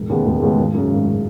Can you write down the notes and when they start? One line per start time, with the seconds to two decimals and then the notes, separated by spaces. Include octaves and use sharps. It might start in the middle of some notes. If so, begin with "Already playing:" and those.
Already playing: E1
0.09 D#2 C#3 G#3 B3
0.26 E1
0.42 D#2 C#3 G#3 B3
0.58 G#1
0.74 F#2 C#3
0.91 G#1
1.07 C#3